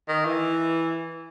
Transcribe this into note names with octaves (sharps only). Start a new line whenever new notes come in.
D#3
E3